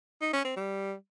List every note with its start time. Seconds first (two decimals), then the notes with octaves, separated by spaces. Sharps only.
0.21 D#4
0.33 C#4
0.45 C4
0.56 G3